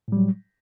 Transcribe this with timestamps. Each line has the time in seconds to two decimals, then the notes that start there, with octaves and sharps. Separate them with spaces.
0.08 A2
0.12 G3
0.17 F#3